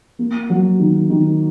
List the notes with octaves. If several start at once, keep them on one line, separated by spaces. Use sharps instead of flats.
A#3
F#3
D#3
D#3